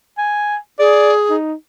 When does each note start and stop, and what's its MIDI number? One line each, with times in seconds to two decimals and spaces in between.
0.18 0.57 80
0.79 1.36 68
0.79 1.12 74
1.30 1.54 63